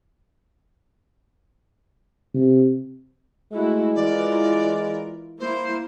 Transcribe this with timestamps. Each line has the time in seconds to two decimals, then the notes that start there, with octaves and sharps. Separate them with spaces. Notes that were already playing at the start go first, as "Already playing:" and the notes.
2.34 C3
3.53 G#3 A3 E4 F#4
3.95 E3 F4 A#4 D5
5.39 A#3 E4 C5